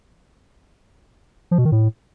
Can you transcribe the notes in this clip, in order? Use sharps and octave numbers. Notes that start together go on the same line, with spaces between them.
F3
B2
D#3
A2